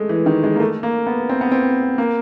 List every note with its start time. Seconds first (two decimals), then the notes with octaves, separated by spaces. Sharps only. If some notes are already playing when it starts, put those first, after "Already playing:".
Already playing: G#3 A3
0.09 E3
0.26 D#3
0.44 G#3
0.56 A#3
0.60 A3
0.83 A#3
1.07 B3
1.29 C4
1.41 B3
1.52 C4
1.98 A#3